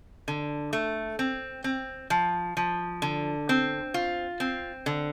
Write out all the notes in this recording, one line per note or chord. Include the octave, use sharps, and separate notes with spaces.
D3
A3
C4
C4
F3
F3
D3
C4
F4
C4
D3